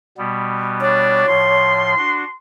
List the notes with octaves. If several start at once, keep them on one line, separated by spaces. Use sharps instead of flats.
B2 G3 B3
D4 C#5
A2 F3 C6
D4 F#4